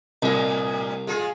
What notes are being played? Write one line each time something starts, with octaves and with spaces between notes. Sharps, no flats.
C2 A2 D#5
G#3 F4 G#4